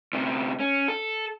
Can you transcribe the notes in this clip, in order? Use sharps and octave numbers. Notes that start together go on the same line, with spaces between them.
D2 C3
C#4
A4